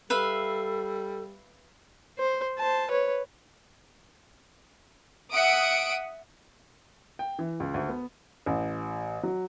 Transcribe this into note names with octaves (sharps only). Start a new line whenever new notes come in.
G3 A4 B4 E5 F5
C5
C5 A5
B4 C#5
E5 F#5 D#6 D7
G5
E3
C#2
D2
B3
A1
F#3